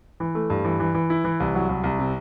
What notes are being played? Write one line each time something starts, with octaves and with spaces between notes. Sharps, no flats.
E3
A3
G2
E3
E3
E3
E4
E3
C2
F#3
C2
C2
C3